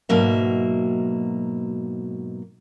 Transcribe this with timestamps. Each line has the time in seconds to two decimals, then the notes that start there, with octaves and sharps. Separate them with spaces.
0.09 G#2 B2 F#3 A#3 E5